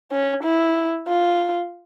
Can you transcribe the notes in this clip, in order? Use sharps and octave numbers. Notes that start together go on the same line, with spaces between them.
C#4
E4
F4